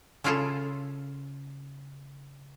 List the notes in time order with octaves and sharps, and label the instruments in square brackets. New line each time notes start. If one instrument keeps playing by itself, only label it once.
[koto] C#3 C#4 E4 F4 G#4 A4